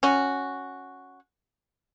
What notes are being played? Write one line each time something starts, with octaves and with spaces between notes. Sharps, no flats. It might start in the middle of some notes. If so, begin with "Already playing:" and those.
C#4 F#4